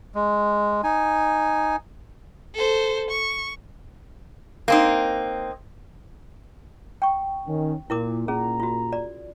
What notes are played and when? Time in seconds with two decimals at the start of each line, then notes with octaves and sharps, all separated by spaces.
0.15 G#3
0.84 D#4 G#5
2.54 A4 C5
3.10 C#6
4.68 A#3 C4 D#4
7.02 G5 C#6
7.47 D#3 C#4
7.90 A#2 E4 A#4 D6
8.28 A#2 C#4 G#4 A#5
8.60 F4 F#4
8.93 D5